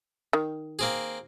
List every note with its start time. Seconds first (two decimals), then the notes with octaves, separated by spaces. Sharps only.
0.33 D#3
0.79 A#3 C4 G#4